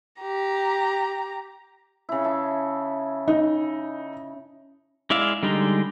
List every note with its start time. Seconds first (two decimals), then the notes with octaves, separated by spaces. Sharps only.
0.22 G4 A#5
2.09 C#3 E4
2.24 E5 A5
3.28 D#4
5.10 G#3 E4 D5 E5 F5
5.43 D3 G3 G#3 D#4